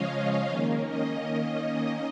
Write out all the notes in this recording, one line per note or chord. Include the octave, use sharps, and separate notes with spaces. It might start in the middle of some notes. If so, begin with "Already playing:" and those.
Already playing: C#3 F3 G#3 C#4 C#5 D#5 F5
D#3 A#3 C#4
D#5